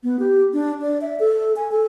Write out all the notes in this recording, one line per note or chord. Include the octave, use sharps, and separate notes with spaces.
B3
G4
D4
D5
E5
A4
G#5
A4